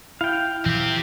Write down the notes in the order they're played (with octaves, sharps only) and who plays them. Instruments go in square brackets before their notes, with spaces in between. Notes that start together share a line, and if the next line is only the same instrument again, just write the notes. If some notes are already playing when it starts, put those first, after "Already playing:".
[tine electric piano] E4 [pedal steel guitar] F5 G5
[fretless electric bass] A#2 E3 F3 [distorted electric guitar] C4 G4